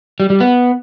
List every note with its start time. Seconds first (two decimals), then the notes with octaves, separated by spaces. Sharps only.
0.20 G3
0.30 G3
0.40 B3